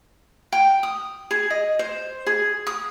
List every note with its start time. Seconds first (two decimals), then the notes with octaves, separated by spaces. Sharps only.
0.52 G5
0.83 D#6
1.31 G#4
1.50 D#5
1.79 C5
2.27 G#4
2.67 D#6